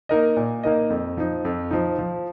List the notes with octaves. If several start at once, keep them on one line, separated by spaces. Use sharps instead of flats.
A#3 D#4 A#4 D#5
A#2
A#3 D#4 A#4 D#5
F2
F3 D#4
F2
F3 D#4
F3